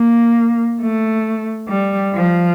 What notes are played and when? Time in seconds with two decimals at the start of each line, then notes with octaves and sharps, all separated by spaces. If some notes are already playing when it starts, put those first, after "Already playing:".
Already playing: A#3
0.81 A3
1.68 G3
2.13 F3